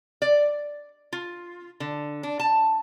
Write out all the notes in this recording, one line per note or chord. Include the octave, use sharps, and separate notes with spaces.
D5
F4
D3
D4
A5